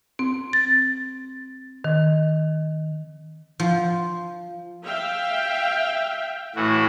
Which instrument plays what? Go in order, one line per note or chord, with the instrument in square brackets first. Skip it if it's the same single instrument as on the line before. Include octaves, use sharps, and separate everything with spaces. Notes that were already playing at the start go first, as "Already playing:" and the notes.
[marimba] C4
A6
D#3
[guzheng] F3
[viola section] E5 F5 G5
[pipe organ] A2 E3 F#4